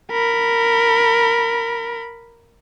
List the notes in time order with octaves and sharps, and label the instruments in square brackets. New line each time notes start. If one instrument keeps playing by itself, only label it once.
[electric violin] A#4 B5